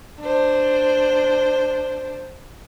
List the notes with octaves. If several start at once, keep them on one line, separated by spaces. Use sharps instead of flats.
D4 C5